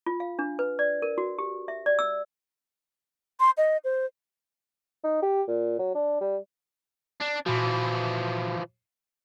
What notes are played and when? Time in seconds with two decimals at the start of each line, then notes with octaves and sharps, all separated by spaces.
0.06 F4
0.20 F5
0.39 D4
0.59 B4
0.79 D5
1.02 A#4
1.18 F#4
1.38 G4
1.68 E5
1.86 D5
1.99 E6
3.40 C6
3.57 D#5
3.84 C5
5.04 D#4
5.22 G4
5.48 A#2
5.79 F#3
5.95 D4
6.21 G3
7.20 D4
7.46 A#2 E3 F3 F#4